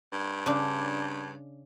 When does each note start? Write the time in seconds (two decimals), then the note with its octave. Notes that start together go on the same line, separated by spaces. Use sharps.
0.12 G2
0.46 C#3 D4